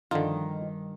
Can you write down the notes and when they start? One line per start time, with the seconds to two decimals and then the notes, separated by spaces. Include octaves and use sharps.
0.11 G2 D3 D#3 F3 D#4 F4